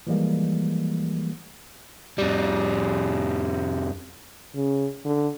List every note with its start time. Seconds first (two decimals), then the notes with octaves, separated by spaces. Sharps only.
0.07 E3 F3 G3 G#3 A#3
2.18 F2 G3
4.55 C#3
5.05 D3